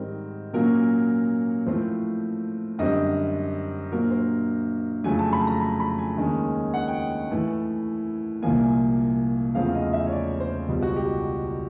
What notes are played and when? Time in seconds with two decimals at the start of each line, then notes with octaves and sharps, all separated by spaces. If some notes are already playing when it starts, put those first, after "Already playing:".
Already playing: G#2 D#3 G3 C4 A#4
0.54 A#2 F#3 A#3 C#4 A#4
1.66 A2 F3 A3 C4 C5
2.79 F#2 D3 G3 C4 D#5
3.92 A#2 F#3 A#3 D4 A#4
4.11 C5
5.04 F2 C#3 F#3 A3 G#5
5.19 A5
5.33 B5
5.41 A5
5.47 A#5
5.61 B5
5.80 B5
5.99 G#5
6.17 D#2 D#3 G#3 C#4
6.74 F#5
6.88 G5
7.31 A2 E3 A3
8.42 C2 A#2 F3 A#3 G#5
9.55 E2 C#3 F3 A3 C4 F5
9.74 D#5
9.93 E5
10.06 C#5
10.12 D5
10.40 C5
10.68 C#2 B2 G3
10.82 F#4
10.96 G4